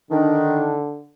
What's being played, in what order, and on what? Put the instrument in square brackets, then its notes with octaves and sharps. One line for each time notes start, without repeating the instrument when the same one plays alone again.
[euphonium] D3 [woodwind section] D#3 D4